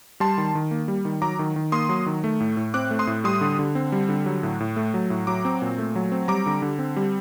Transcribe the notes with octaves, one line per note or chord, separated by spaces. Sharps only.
G3 A5 C6
D#3
D#3
A#3
G3
D#3
F#3 A#5 D6
D#3
D#3
A#3 C6 D#6
F#3
D#3
A3
A2
A2
C4 D6 F#6
A3
C6 D#6
A2
G3 C6 D#6
D3
D3
C4
G3
D3
F#3
A2
A2
A3
F#3
A2
F#3 A#5 D6
C4
A#2
A3
F#3
C4
G3 A#5 D6
D3
D3
C4
G3